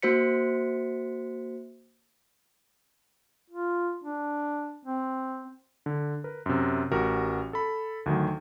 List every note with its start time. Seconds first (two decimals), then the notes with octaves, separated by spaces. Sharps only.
0.02 A#3 F#4 C5 B6 C#7
3.50 F4
4.04 D4
4.85 C4
5.86 D3
6.24 A#4 B4
6.46 F#2 C3
6.91 A1 F#4 G4 A#4
7.53 A4 B5
8.06 D2 D#3 F#3